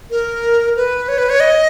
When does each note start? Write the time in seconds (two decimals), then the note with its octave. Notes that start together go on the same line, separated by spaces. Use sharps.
0.11 A#4
0.76 B4
1.09 C#5
1.18 B4
1.30 C#5
1.40 D#5